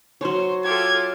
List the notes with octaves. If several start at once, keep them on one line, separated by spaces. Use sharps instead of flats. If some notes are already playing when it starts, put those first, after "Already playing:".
F#3 C5 C#5
F4 G4 A4 G#6